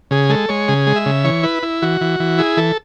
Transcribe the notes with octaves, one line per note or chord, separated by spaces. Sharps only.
C#3 G#4
G#3 A4
G#3 C#5
C#3 G#4
G#3
E5
C#3
E3 C#5
E4 B4
E4
E3 F#4
E3
E3
E4 G#4
E3 A4